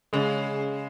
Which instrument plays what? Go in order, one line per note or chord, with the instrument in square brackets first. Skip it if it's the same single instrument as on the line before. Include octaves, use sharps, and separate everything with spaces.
[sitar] C#3 [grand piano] G#3